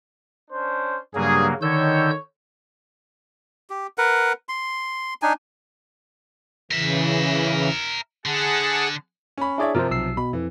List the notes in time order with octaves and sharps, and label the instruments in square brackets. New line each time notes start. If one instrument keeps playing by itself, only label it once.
[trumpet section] C#4 D4 C5
[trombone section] G2 [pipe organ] C#3 F#3 A#3 [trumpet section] G#4
[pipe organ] D3 E6 G6 [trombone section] D#3 [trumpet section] C#5
[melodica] G4
A#4 B4 F#5
C6
D4 D#4 G#5
[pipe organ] C#3 E3 [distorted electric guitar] A#4 E5
[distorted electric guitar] D3 [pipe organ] G#4 F#5 A5
[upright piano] C#4 B5
[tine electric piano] D4 G#4 C#5 [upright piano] E4 D5 E5
[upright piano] C3 F3 [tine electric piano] A#4 C5
[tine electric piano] B1 E6 C7
[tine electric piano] B2 [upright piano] B5
[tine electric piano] F2 [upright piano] E3